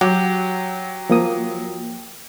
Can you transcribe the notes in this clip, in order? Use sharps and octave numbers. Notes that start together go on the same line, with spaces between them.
F#3 G4 F#5
F3 A#3 D#6